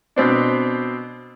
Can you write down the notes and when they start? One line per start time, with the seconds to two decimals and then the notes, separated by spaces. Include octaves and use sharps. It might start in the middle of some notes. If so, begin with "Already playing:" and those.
0.16 B2 C4 D4